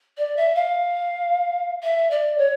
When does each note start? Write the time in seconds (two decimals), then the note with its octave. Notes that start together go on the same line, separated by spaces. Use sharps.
0.18 D5
0.36 E5
0.55 F5
1.83 E5
2.11 D5
2.38 C#5